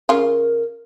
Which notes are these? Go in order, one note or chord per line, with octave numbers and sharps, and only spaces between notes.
C#3 F4 A#4